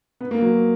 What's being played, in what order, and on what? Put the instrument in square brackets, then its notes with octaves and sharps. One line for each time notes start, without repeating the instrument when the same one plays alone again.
[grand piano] B3
A#3
F#3